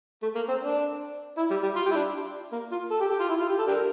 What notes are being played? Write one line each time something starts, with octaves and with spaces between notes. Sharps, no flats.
A3
A#3
C4
D4
E4
G3
G3
F4
G4
E4
D4
A#3
F4
A4
G4
G4
F4
E4
F4
G4
A4
D4 G4 A#4